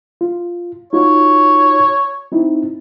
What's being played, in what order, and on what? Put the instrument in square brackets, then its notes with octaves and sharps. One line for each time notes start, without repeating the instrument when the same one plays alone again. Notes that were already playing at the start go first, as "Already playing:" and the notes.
[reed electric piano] F4
[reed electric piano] D#4 F4 F#4 [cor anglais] C#5
[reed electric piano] C4 D#4 E4